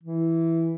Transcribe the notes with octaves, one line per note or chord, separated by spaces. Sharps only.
E3